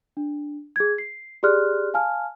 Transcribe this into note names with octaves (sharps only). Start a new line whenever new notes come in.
D4
G#4 G#6
C7
G4 G#4 D5 C6 F6 F#6
F5 G#5 A5 F6